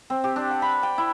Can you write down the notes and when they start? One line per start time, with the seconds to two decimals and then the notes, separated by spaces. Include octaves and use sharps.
0.10 C4
0.24 G4
0.36 D4
0.51 F#5
0.62 B5
0.83 G5
0.98 E4